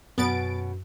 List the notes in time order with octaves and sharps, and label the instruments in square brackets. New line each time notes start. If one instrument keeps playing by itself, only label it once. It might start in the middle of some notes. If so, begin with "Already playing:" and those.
[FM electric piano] F#2 [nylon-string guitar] B2 C#4 [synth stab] B3 A6 D7